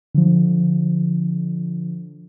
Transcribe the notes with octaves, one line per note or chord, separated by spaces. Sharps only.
D3 F3